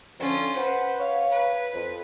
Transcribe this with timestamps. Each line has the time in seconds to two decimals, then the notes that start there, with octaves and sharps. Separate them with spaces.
0.20 F2 D3 C#4 F4
0.56 B4 C5 F#5
1.00 C#5 F5
1.32 B4
1.74 F2